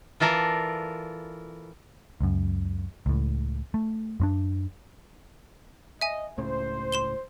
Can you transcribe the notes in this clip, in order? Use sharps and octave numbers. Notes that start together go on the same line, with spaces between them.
E3 F4 A4 A#4 D5
C#2 F#2
C#2 A2
A3
F#2 C4 D4
D#5 E5 G#5
C#2 A2 C#3 C5
C6 E7 G7